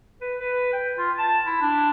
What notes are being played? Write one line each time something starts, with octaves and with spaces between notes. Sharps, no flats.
B4
B4
G5
F4
A5
E4
D4